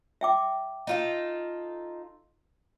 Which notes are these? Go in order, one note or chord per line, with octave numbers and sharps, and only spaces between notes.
E5 G5 D6
D#4 F4 A4